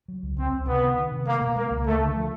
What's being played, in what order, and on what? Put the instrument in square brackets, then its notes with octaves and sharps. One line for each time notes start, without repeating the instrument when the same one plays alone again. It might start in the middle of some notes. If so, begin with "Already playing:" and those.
[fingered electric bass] F#3
C#2
[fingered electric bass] C#2 [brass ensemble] C4
[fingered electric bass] C#2
[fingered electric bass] C3 [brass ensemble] B3
[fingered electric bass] D#3
D#3
C3
[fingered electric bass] G#3 [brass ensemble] A#3
[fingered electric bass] B2
[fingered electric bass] G#3 [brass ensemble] A#3
[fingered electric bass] C#2
[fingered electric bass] D2 [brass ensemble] A3
[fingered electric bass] D3
F3